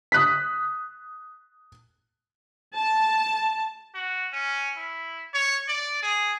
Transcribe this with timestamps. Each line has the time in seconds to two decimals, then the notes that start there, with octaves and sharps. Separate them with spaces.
0.12 D#6 F#6 B6
2.76 A5
3.95 F#4
4.33 C#4
4.77 E4
5.34 C#5
5.68 D5
6.03 G#4